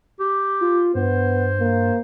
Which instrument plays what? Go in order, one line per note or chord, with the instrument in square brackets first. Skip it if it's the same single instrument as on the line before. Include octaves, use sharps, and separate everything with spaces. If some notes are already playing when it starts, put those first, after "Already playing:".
[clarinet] G4
[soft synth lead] F4
[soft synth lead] G2 [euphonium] B3 [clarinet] C5
[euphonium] A#3